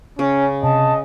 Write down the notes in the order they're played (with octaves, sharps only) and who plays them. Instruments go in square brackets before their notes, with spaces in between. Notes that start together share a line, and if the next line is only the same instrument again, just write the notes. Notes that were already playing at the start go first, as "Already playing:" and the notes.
[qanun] C#3 [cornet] C#4
[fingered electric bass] C3 [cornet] D#5 [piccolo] A5